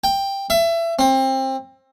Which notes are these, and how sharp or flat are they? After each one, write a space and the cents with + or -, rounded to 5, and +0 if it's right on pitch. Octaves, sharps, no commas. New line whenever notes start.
G5 +10
E5 +25
C4 +25